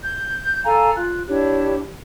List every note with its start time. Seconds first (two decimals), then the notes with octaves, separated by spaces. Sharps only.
0.01 G6
0.64 A4 F5 G#5 A#5
0.95 F4 F#6
1.28 D4 E4 G4 C#5